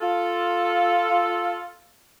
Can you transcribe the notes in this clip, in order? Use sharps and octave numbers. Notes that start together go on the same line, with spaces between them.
F4 A4